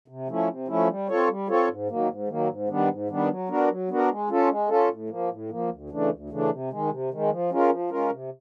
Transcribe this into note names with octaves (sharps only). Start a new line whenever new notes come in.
C3
F3 A3 C#4 E4
C3
F3 A3 C#4 E4
G3
C4 F4 A4 C#5
G3
C4 F4 A4 C#5
G#2
D#3 F#3 A#3
G#2
D#3 F#3 A#3
G#2
D#3 G3 B3 D4
G#2
D#3 G3 B3 D4
F#3
B3 D4 F#4 A#4
F#3
B3 D4 F#4 A#4
G#3
C#4 F4 A4
G#3
C#4 F4 A4
A2
F3 A#3
A2
F3 A#3
D2
C#3 E3 A3 D4
D2
C#3 E3 A3 D4
C3
D#3 G#3
C3
D#3 G#3
F3
G#3 C#4 F4 A#4
F3
G#3 C#4 F4 A#4
C3